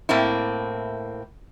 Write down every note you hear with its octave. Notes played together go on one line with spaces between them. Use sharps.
A2 A#3 C4 E4